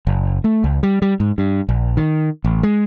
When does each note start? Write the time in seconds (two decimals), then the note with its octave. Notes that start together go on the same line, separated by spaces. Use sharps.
0.07 F#1
0.44 A3
0.64 C#2
0.83 G3
1.02 G3
1.20 G#2
1.38 G2
1.69 A#1
1.97 D#3
2.44 A1
2.63 G#3